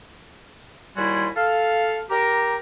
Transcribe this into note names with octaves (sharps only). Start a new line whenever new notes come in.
D#2 G3 E4 F#4 G#5 C6
A4 F5
G4 A#4 A#5